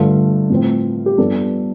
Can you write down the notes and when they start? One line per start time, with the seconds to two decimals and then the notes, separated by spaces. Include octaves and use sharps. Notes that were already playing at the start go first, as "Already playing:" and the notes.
Already playing: G2 D3 A3 F4
0.50 A2 F3 C4
1.06 G4
1.18 G2 F3 B3 D4 A4